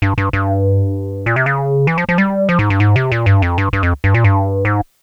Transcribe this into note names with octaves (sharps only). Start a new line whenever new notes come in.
G2
G2
G2
A#2
C3
C#3
E3
F3
F3
G3
F3
G#2
G2
G#2
C3
A#2
G2
F2
G2
G2
F2
G2
A#2
G2
G#2